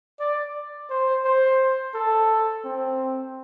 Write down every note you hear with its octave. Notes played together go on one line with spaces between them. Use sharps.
D5
C5
C5
A4
C4